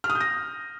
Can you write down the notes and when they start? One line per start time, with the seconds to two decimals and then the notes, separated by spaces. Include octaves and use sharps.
0.04 F6
0.10 D#6
0.15 G6
0.20 A#6